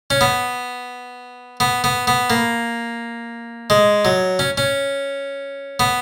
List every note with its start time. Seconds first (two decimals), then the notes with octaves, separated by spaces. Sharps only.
0.10 C#4
0.21 B3
1.60 B3
1.84 B3
2.07 B3
2.30 A#3
3.70 G#3
4.05 F#3
4.39 C#4
4.58 C#4
5.80 B3